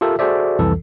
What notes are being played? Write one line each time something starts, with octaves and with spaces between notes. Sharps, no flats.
F4 G4 A4 A#4 E5
F#4 G#4 A4 C5 D5 E5
C2 F2 E3 A4